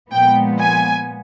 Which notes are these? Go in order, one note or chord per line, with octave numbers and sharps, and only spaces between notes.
A#2 F3 G#3 B3 G5
G#5